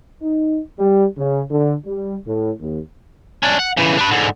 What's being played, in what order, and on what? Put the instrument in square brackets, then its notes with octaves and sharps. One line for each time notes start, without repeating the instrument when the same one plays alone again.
[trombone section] D#4
G3
C#3
D3
G3
A2
D#2
[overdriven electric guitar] C#4 D4
F#5
C#3 E3
D4 B4
G#2 D3